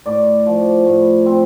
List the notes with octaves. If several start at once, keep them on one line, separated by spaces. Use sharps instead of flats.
A2 D5
F3
A2
C4